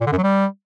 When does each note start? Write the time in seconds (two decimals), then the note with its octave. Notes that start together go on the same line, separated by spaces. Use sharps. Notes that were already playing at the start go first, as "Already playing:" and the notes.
0.01 A#2
0.07 D3
0.12 F#2
0.18 F#3
0.24 G3